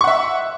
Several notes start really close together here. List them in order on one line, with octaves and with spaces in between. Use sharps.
C#6 F#5 E5